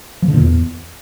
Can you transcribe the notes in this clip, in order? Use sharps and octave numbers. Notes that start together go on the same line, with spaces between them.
F3
D3
A#2
E2